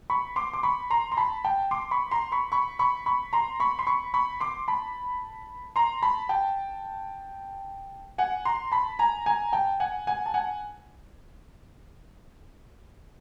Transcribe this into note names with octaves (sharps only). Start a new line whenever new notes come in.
B5 C#6
C6 D6
D6
B5 C#6
A#5 C6
C6
A5 B5
G5 A5
C6 D6
B5 C#6
A#5 C6
B5 C#6
B5 C#6
B5 C#6
B5 C#6
A#5 C6
B5 C#6
C6
B5 C#6
B5 C#6
C6 D6
A5 B5
A#5 C6
A5 B5
G5 A5
F#5 G#5
A#5 C6
A5 B5
G#5 A#5
G#5 A#5
G5 A5
F#5 G#5
F#5 G#5
A5
F#5 G#5